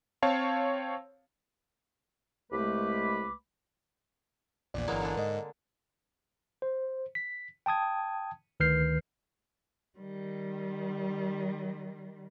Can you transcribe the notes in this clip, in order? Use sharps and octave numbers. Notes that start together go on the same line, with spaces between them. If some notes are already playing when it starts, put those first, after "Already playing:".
C4 C#5 F5 A5
C2 G#3 A3 B4 B5 D6
A#1 E2 A#2 D5
G1 E3 F#3 G#3 A#3
D3 G#3 D4
G#2 A#4 D#5
C5
B6
G5 A5 D#6 G#6
D2 D#3 B4 F6 G6 C7
D#3 G3